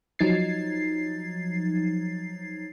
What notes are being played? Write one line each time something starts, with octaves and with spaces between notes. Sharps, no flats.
F3 F#3 D#4 G#6 A6 C7